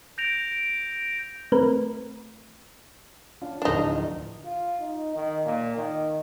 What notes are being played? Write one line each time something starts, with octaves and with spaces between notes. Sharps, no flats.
G6 A#6 D7 F7
A3 C4 A#4 B4
C#4 D4 F4
D1 F3 D4 D#4
F4
D#4
D#3
A#2
D#3